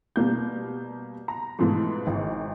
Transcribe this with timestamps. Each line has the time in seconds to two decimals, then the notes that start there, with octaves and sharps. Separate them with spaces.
0.16 B2 G3 A#3 G6
1.28 A#5
1.59 G#2 B2 E3 F3 A3
2.07 G#1